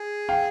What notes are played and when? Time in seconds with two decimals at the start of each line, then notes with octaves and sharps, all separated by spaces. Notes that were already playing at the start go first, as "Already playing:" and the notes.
Already playing: G#4
0.29 F5 G5